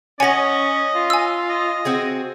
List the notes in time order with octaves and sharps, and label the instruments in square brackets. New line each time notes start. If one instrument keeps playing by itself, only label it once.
[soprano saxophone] C#4 [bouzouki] C#5 F#5 [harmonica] D#5 [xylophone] G#5 A#6
[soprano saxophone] F4
[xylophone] G#5 E6
[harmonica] D#5
[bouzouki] C4 F#4 G#4